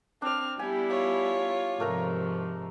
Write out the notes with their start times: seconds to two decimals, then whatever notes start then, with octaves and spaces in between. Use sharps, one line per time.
0.22 C4 D4 D5 F6
0.59 G3 B3 E4 G4 G#5
0.90 F4 C#5
1.80 G#2 C3 F3 A3 A#4 A#5